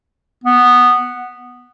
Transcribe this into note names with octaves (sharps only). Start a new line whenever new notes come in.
B3